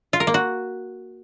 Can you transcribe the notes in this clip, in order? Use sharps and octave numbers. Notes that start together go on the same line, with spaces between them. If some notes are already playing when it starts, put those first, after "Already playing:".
F4
A#4
A#3
F#4